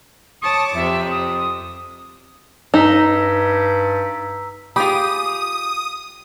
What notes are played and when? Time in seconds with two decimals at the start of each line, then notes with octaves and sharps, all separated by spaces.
0.42 C#5 A5 D6 D#6
0.75 F2 C3 E5
1.11 D#6
2.74 G2 D#4 A#5 E6 B6
4.76 F4 G4 G#4 B5 D#6